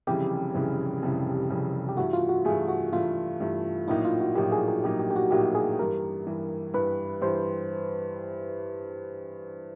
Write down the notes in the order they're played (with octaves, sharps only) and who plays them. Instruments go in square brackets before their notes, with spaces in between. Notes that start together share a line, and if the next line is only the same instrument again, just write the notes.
[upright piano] F1 F2 C#3 E3 G3 [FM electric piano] G4
[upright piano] F1 F2 C#3 E3 G3
F1 F2 C#3 E3 G3
F1 F2 C#3 E3 G3
[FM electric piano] G4
[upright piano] G2 E3 A3 [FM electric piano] F#4
[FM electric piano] F4
F#4
[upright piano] G2 E3 A3 [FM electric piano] G#4
[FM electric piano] F#4
[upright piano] G2 E3 A3 [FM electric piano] F4
[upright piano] G2 E3 A3
[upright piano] A#1 A2 F#3 A#3 D#4 [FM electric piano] E4
[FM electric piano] F4
F#4
[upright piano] A#1 A2 F#3 A#3 D#4 [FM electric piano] G4
[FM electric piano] G#4
G#4
[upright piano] A#1 A2 F#3 A#3 D#4 [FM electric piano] G4
[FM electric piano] G4
G4
F#4
[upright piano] A#1 A2 F#3 A#3 D#4 [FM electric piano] G4
[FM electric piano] G#4
[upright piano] G2 E3 G3 [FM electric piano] A#4
[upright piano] G2 E3 G3
[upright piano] G2 E3 G3 [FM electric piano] B4
[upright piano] G2 E3 G3 [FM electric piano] C5